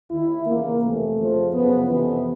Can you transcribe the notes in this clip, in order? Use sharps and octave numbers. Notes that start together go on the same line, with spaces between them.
D#2 D#3 E4
D#2 C#3 E3 A#3
F2 C3 E3 A3
F2 C#3 F3
F#2 C#3 F3 B3
F2 C3 E3 B3